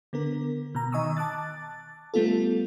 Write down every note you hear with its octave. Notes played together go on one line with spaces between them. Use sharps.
D3 B3 A#4
B2 A#5
D#3 D#5 G#5 C#6 D#6 E6
A5 D6 F#6 A6
G3 A3 B3 F4 A4